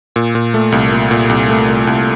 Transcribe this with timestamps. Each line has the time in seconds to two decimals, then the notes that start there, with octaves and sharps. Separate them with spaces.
0.16 A#2
0.35 A#2
0.54 A3
0.72 C2
0.92 A#2
1.11 A#2
1.29 C2
1.49 A3
1.68 C2
1.87 C2